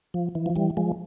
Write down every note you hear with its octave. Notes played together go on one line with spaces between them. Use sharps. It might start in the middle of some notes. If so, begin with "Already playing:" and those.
F3
E3
F3
E3 G3
F3 G#3